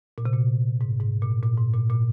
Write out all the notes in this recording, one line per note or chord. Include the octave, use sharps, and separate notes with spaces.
A#2
C3
A#2
G#2
G#2
A#2
A#2
G#2
A#2
A#2